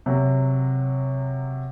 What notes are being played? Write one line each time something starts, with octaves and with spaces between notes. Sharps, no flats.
C3 F#3